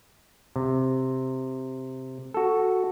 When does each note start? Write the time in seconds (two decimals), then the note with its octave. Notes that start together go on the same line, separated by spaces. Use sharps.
0.56 C3
2.34 F#4 A4